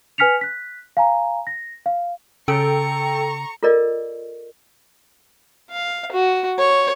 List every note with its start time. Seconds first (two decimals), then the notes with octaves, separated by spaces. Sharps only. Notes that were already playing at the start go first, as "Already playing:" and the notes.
0.18 B4 G#5 F6 B6 C#7 F7
0.41 F#6 B6
0.97 F5 G#5 A#5
1.47 A#6
1.86 F5
2.48 C#3 A4 G5 A#5 C#6
3.63 F4 A4 A#4 D5 D#5
5.71 F5
6.12 F#4
6.59 C#5